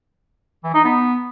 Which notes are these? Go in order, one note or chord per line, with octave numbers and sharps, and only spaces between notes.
E3
D#4
B3